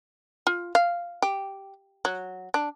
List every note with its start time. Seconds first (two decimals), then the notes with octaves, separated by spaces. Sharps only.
0.47 F4
0.75 F5
1.22 G4
2.05 F#3
2.54 D4